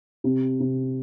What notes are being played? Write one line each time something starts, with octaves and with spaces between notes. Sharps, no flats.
C3
C3